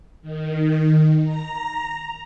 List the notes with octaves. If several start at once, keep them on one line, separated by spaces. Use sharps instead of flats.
D#3
A#5